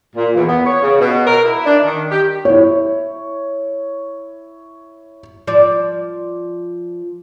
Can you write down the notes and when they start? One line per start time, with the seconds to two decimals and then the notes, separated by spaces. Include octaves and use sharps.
0.16 A#2
0.35 E2
0.49 B3
0.65 C#5
0.82 C#3
1.00 B2
1.27 A#4
1.44 E4
1.65 D4
1.84 D#3
2.11 G4
2.45 E4 C#5
5.47 F3 D5